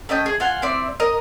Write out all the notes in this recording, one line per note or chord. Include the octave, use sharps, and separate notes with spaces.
A3 C#4 D#5 G5
G#4
F4 F5 F#5 G#5
C4 E4 D5
A#4 D#5